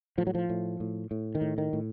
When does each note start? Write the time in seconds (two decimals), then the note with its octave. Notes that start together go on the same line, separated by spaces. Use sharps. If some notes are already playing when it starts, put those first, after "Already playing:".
0.18 A2 F3
0.27 F#3
0.35 F3
0.49 A2
0.80 A2
1.11 A2
1.35 D#3
1.41 A2
1.58 D#3
1.73 A2